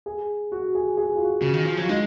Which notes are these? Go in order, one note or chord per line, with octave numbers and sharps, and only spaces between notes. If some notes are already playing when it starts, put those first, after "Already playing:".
G#4
F#4
G#4
G#4
F#4
F4
F#4
C#3
D#3
F3
F#3 F4
G#3 D#4